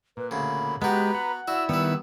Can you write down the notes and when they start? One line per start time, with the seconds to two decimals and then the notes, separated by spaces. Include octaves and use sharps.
0.17 A#2 B4
0.31 D2 C#3 B5
0.82 G#3 B3 F#4 G4 B4 A#5
1.15 F#5
1.48 E4 F#4 D5 E6
1.69 D#3 G3 B3 B4